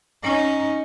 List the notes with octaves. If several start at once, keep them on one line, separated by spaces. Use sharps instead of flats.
C#4 D#4